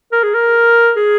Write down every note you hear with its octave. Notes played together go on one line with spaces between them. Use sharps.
A#4
G#4
A#4
G#4